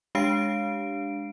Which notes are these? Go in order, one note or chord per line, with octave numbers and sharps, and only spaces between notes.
G#3 D4 G4 F5 C7 D7